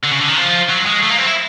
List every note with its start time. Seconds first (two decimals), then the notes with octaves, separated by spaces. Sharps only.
0.03 D3
0.11 C#3
0.20 D3
0.28 D#3
0.36 F3
0.69 F#3
0.86 G#3
1.02 A3
1.10 A#3
1.18 C4
1.27 E4